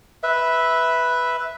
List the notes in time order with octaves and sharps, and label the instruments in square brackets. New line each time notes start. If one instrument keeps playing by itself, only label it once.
[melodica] B4 E5